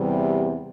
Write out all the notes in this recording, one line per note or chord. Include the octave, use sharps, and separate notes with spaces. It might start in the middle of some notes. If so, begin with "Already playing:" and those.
Already playing: E2 C3 G3